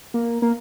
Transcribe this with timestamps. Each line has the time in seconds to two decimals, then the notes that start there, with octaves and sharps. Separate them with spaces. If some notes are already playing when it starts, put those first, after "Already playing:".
0.14 A#3
0.42 A#3